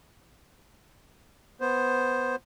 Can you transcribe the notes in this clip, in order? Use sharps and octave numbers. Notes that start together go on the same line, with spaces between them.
B3 C5